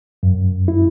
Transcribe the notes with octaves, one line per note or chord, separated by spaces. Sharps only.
F#2
E4